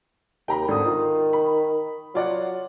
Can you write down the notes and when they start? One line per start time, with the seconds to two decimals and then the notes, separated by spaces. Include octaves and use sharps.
0.48 D#2 G5 A#5 B5
0.68 G#1 D3 D#6
0.84 D#3 F4
1.33 B5
2.15 F#3 F4 D5 F#5